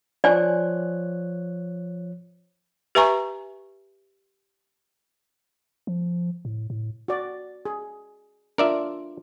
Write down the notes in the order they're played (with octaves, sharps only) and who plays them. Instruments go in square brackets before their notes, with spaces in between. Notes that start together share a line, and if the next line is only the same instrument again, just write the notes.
[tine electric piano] F3 C#5 F#6 [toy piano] D5 G#5
[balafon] G4 B4 E5 G#5 A#5 C#6
[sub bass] F3
A2
A2
[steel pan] F#4 D5
G#4
[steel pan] D4 F4 [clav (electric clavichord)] A#4 D5 E5